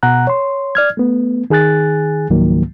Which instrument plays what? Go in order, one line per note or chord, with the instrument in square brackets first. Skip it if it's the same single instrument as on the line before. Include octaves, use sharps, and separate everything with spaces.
[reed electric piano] B2 F#5 A#5 F#6
C#5 C6
D5 F6 G#6
A3 B3
D#3 G#4 G#5 F#6 A6
C#2 G#2 D#3 F3 F#3 A#3